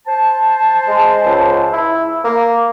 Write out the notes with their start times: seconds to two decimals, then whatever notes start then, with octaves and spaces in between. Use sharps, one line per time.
0.06 C5 A5
0.87 G#3
1.25 C#2
1.73 E4
2.24 A#3